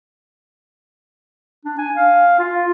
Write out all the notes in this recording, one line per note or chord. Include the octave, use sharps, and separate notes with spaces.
D4
G#5
F5
F4